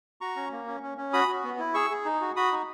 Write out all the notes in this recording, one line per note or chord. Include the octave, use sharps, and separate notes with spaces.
F#4 A#5 C#6
C#4
A#3
C#4
C#4
C#4
F#4 B5 D#6
F#4
B3
E4
G#4 C#6 E6
G#4
D#4
F#4
F#4 B5 D#6
D#4